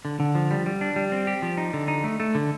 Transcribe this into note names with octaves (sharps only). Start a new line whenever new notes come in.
D3
D3
F3
G3
G3
D4
G3
C4
G4
F3
D#4
D3
D#4
A3
A3
D3